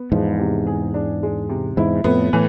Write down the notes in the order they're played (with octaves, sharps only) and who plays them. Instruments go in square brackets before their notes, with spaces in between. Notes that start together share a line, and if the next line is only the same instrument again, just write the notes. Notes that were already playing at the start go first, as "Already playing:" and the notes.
Already playing: [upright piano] B3
[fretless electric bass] E2 G#2 [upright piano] F3
[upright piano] C3
G#4
D4
G#3
C3
[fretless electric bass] E2 G#2 [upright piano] E4
[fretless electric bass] F2 A2 [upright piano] B3
[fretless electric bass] A2 [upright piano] E3